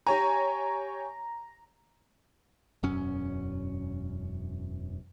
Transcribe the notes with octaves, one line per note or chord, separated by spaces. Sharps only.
G4 C#5 G#5 A#5
E1 F#2 C#4